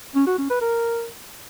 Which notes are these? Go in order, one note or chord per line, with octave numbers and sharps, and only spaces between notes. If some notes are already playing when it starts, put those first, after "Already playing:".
C#4
F#4
C#4
B4
A#4